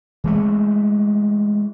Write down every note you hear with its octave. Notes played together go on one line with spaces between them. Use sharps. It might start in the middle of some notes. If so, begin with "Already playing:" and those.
E3 G#3 A3